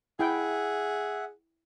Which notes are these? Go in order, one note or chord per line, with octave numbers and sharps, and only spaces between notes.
E4 G#4 E5 F#5 G5